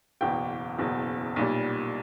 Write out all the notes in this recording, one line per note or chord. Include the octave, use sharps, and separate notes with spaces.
F#1 E2 B2 G5
F#1 E2 B2
B1 A#2 G3